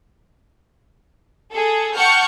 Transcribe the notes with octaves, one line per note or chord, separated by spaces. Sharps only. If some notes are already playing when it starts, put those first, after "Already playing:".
G#4 A4
F#5 G5 A5 C#6 F6 G6